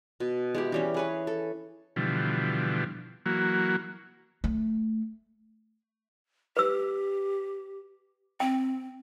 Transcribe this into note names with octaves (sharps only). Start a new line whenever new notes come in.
B2
G#3 E4 G4
E3 G3 C#4
G#4 B4 C#5
A4
B2 D3 E3 F3 G3
E3 F#3 A#3 F#4
A3
G4 B4 E6
C4 G5